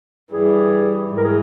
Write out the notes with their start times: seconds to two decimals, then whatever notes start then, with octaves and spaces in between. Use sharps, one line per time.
0.32 G2 E3 G3 G#4
1.09 G#2 E3
1.17 A#4
1.24 G#4